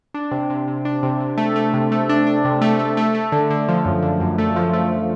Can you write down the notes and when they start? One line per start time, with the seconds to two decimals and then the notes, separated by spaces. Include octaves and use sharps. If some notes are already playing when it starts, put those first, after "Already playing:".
0.14 D4
0.31 C3
0.50 C3
0.68 C3
0.85 D4
1.03 C3
1.20 C3
1.38 A3
1.56 A3
1.74 C3
1.92 A3
2.09 D4
2.27 D4
2.45 C3
2.61 A3
2.79 A3
2.97 A3
3.14 A3
3.32 D3
3.50 D3
3.68 F3
3.85 F#2
4.03 D3
4.20 F#2
4.38 A3
4.56 F3
4.73 A3